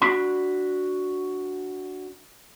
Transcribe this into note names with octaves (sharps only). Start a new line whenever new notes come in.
D4 F#4 B5